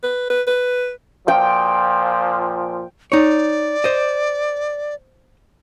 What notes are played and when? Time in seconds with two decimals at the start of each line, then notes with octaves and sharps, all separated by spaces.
0.03 B4
0.30 B4
0.47 B4
1.28 A#2 F3 G5
3.12 D#4 C#5 D5
3.84 C5 D#5